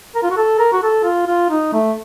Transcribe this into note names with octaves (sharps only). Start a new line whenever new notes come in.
A#4
F4
F#4
A4
A#4
F#4
A4
F4
F4
D#4
A3